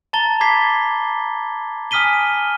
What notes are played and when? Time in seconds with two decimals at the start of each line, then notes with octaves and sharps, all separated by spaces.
0.13 A5 A#5 A6 G7
0.40 B5 D6 G#6 B6 C7
1.91 G#5 D#6 F6 B6 D#7 G7